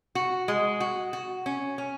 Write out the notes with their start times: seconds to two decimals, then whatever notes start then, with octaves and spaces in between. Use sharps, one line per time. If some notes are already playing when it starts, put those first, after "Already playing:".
0.15 F#4
0.48 G#3
0.80 F#4
1.13 F#4
1.46 C#4
1.78 C#4